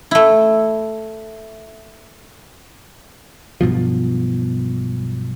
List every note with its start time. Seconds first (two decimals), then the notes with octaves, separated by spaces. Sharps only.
0.11 A3 E4
3.61 B1 G2 B2 F3